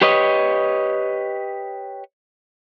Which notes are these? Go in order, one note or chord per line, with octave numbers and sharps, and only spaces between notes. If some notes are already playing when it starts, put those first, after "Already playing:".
G4 B4 C#5 D#5